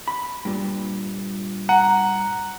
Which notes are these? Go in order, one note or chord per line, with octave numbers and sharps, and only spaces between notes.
B5
G2 A#2
F#5 A#5